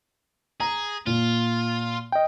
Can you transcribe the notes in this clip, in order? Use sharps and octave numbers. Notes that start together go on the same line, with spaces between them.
G#4 A#5
A#2 F4
D#5 G5